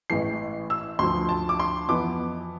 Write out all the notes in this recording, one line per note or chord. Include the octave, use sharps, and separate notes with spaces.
A1 A2 E3 G#3 C7
E6
D2 D3 F3 C6
A5
D6
C6
F2 E3 B3 D6